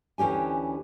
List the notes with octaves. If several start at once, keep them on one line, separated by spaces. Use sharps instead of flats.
D2 E3 C#4 G4 G#5